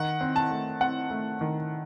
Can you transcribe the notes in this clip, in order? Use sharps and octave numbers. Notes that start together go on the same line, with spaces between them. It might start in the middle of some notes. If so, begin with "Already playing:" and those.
Already playing: D#3 F#5
C4
A5
A3
C4 F#5
A3
D#3